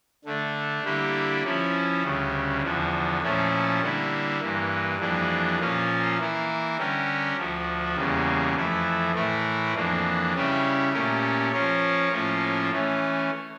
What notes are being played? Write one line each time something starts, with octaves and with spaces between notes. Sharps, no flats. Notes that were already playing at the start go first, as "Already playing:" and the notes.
D3 A3 D4
D3 G3 A#3 E4 G4
F3 C#4 E4
D2 C#3 G3
E2 D3 F3
A#2 F3 A3 C#4 E4
D3 G3 A#3 E4
G2 E3 A#3
F2 E3 G3 A#3 D4
A#2 F3 A#3 C#4 F4
E3 A#3 E4 A#4
D3 G3 C#4 G4 A#4
D2 D3 F3
E2 C#3 G3 A#3
F2 E3 A3 E4
A2 E3 A3 E4 A#4
F2 E3 A#3 D4
C#3 G3 C#4 E4 G4
A#2 A3 C#4 G4 A#4
F3 C#4 F4 A#4 C#5
A2 F3 A#3 C#4 F4
E3 A3 C#4